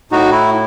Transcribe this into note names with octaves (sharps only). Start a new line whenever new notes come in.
A2 D#4 F#4
E4